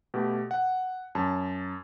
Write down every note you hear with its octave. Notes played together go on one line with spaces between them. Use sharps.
B2 A3 G4
F#5
F#2 A5